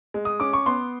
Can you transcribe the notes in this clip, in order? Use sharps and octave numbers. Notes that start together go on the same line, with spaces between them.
G#3
D#6
C#4 D6
C#6
B3 C6